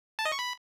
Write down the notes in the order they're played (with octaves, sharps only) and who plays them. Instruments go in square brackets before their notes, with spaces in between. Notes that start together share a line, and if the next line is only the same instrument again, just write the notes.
[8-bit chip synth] A5
D#5
C#6
B5